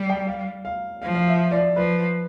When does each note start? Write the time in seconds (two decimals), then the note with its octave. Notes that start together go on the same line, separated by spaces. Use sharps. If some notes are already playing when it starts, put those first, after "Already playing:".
Already playing: G3 D5
0.10 G5
0.27 F5
0.65 F5
1.02 F3 F5
1.15 F5
1.27 E5
1.51 D5
1.76 F3 B4